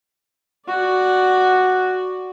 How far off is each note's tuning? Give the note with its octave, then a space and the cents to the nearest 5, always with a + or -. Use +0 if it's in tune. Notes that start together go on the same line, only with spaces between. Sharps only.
F#4 +0 D5 +0